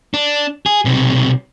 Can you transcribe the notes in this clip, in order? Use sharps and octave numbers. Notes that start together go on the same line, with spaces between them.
D4
G#4
B1 C3